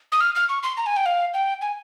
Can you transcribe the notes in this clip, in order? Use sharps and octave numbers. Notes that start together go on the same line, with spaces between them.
D#6
F6
F6
C#6
C6
A#5
G#5
G5
F5
G5
G#5